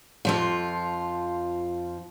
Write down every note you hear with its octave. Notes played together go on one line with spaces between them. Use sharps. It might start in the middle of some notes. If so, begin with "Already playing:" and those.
F2 F3 F4